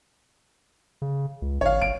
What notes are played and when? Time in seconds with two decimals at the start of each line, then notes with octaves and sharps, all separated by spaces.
1.02 C#3
1.42 C#2
1.61 G#1 C#5 F5
1.82 G1 D7